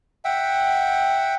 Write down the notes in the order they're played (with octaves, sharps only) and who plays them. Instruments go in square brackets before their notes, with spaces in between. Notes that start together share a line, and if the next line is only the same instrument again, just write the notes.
[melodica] E5 F#5 G5